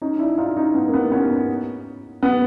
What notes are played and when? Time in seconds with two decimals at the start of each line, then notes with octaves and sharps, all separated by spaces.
0.02 C#4 D#4
0.19 D4 E4
0.38 D#4 F4
0.56 C#4 D#4
0.74 B3
0.88 A#3
0.94 B3
1.12 B3 C#4
2.23 B3